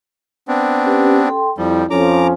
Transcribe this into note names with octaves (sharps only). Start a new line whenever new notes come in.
B3 C4 D4
C#4 G4 B4
A4 G5 C6
F2 F3 G3 E4
F2 F3 C#4 A4 A#5 D6